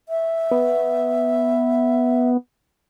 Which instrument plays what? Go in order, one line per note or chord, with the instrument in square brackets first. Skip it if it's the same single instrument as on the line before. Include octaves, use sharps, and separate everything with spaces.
[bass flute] E5
[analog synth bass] B3